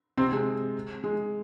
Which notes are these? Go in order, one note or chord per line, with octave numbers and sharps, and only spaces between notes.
C3 C4
G#3
G#3